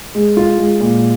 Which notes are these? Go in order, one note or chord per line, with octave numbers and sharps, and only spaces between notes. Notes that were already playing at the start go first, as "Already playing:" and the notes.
G#3
F4
G#3
A#2